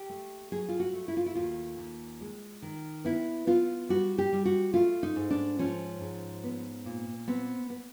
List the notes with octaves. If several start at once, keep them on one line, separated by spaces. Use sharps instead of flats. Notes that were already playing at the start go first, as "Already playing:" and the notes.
Already playing: G4
A3
F#3 G#4
F4
F#4
A3
E4
F4
E4
D#2 F4
D#2
G#3
D#3
B3 E4
B3 F4
G3 F#4
G4
G3
F#4
A3 F4
D#4
G#2
D4
F3 C#4
G#2
B3
A#2
B3 C4
B3